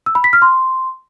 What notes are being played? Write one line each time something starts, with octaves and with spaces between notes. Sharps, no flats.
E6
B5
B6
F6
C6